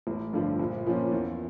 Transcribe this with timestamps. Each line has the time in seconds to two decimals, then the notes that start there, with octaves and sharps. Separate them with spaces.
0.07 A1
0.33 G2 D3 F3
0.60 A#1
0.86 A#2 F3 A#3 C#4
1.11 E2